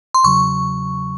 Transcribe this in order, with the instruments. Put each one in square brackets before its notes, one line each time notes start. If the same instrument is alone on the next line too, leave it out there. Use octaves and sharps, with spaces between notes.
[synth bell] C6
[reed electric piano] E2 C#3 F#3 [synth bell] C#6